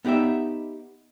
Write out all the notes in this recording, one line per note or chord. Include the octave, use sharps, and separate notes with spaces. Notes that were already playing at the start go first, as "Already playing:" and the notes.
B3 D#4 G4 D5 E5